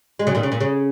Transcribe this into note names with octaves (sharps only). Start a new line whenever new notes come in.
G#3
C#3 F#3
A#2 D#3
C#3
A#2
C#3